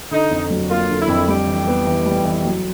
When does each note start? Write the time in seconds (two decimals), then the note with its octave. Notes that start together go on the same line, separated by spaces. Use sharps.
0.11 D3 D#4
0.31 F2
0.50 F#3
0.69 A#3 F4
0.89 D3
0.99 E4
1.08 F2
1.28 G3 G4
1.47 E3
1.67 B3
1.86 E3
2.06 G3
2.25 E3
2.45 F#3